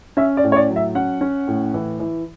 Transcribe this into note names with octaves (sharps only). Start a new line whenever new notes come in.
C#4 E5
D5
A2
C#5
D5
F#3
E5
C#4 F#5
C#4
A2
E3
E3